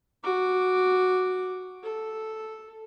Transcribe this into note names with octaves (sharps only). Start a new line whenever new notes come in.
F#4 D6
A4